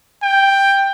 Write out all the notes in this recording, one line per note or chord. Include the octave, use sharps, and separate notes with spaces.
G5